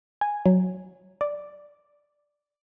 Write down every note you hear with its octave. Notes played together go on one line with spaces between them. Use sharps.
G#5
F#3
D5